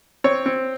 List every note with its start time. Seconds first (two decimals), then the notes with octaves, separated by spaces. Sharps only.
0.24 C4 C#5
0.46 C4